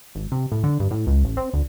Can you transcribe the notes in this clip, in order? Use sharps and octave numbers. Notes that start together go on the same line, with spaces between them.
G#1
C3
A2
D3
G2
A2
C#2
A1
C4
D2